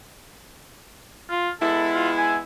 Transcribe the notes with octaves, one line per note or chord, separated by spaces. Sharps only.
F4
G#3 B3 E4 A4
F4
G#5